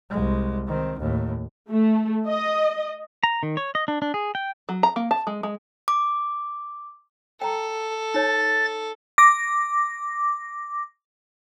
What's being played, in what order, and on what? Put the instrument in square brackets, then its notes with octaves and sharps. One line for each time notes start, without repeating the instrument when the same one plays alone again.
[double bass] C2 G#3
D#3 C4
D#2 A2
[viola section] A3
D#5
[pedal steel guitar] A#5
D#3
C#5
D#5
D4
D4
G#4
G5
[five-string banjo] F#3
A#5
A#3
A5
G#3
G#3
[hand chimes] D6
[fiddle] A4 [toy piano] G5 A#5
[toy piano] D#4 C#5 [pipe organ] A6
[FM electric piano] D6 A#6